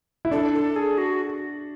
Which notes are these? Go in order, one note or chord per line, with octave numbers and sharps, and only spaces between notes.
E4
D4 A4
A4
G#4
F#4